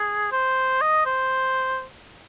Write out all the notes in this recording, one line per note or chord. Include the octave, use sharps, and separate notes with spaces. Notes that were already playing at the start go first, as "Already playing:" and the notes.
Already playing: G#4
C5
D#5
C5